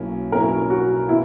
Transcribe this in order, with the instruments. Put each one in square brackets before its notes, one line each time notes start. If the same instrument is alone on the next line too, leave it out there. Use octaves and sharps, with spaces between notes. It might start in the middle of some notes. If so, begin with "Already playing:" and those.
Already playing: [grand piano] B1 B2 A#3 C#4 E4
[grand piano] B1 B2 A#3 C#4 E4 [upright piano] A#4
[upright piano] F#4
[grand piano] B2 [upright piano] E4